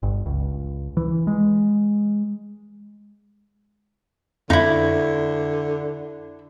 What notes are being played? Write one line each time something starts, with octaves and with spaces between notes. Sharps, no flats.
G1
C#2
E3
G#3
F2 D3 D#4 E4